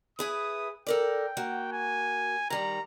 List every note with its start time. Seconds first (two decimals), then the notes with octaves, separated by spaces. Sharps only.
0.19 E4 G#4 B4 D#6
0.87 A4 A#4 D5 G5
1.37 A#3 F#4
1.72 G#5
2.50 D#3 G3 A#5